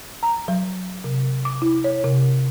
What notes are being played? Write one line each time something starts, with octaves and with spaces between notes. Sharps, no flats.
A#5
F#3
C3
D6
E4
C#5
C3